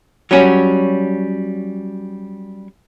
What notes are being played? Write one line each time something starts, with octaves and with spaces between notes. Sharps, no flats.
F#3 G3 C#4 F#4